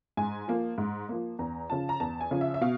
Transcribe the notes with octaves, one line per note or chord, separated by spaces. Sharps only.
G#2 G#5
F3 A#3
G#2
F3 A#3
E2 A#5
C#3 F3 A5
A#5
E2 A5
G#5
C#3 F3
E5
E5
B2 F5